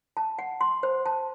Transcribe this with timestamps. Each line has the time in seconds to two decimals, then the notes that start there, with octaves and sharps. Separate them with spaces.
0.17 A5
0.39 F#5
0.61 C6
0.83 C5
1.06 A5